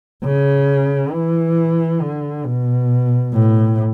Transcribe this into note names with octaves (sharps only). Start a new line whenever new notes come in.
C#3
E3
D3
B2
A2